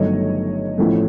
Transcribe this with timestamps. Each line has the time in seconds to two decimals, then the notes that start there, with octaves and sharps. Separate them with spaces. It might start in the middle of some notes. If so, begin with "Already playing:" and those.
Already playing: G1 G2 D#3 F#3 A3 C#5 D#5
0.78 A1 A2 F3 A3